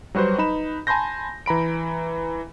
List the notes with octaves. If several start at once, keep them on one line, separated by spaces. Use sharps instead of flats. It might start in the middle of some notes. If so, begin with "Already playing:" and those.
F#3 G3 F#4 B4 C5
D#4 B4 B5 E7
G#5 A5 B5 C6 G6 A#6
E3 A#5 B5 D7